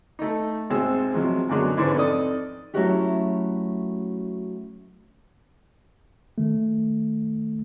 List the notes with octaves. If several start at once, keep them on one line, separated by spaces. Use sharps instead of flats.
A3 D#4
G#1 C3 G#3 C5 E6
C3 F3 F#3 G#3
F#2 B2 D3 F#3 G#3
G#2 D3 E3 C#4 D#4 E4
F2 D#4 A4 D5 D#6
F#3 A3 C#4 E4 F#4 G4
D#3 A3